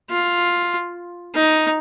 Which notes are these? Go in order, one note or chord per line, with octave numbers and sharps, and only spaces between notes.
F4
D#4